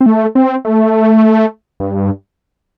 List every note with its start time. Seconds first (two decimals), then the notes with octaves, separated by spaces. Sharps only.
0.01 C4
0.06 A3
0.35 C4
0.65 A3
1.80 G2